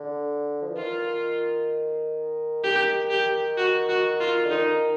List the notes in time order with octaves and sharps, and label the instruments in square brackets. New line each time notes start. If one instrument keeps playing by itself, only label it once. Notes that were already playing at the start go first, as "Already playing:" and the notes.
Already playing: [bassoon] D3
F3
E3
[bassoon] D#3 [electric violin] F4
[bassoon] D#3 [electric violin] G4
[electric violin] G4
F#4
F#4
F4
[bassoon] D3
[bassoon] D#3 [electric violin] D#4